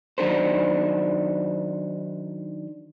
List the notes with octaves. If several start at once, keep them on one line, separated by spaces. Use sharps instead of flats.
D#3 F#3 D4 A4 C5